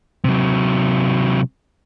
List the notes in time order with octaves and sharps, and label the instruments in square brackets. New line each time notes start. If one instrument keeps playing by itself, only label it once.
[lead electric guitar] C3 F#3